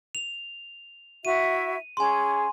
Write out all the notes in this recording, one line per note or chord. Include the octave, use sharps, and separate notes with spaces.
F7
E4 F#4 E5 D#7
C#4 G#4 G#5 C6